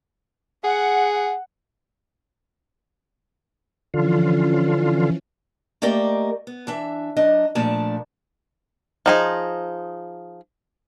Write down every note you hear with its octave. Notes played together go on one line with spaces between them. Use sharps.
G#4 F#5
D3 E3 F3 C#4 F4
A3 A#3 G4 A#4 D5 D#5
B3
E3 D4 E5
F#3 D4 D#5
A#2 F3 A3 D4 D5 A5
F3 D#4 G#4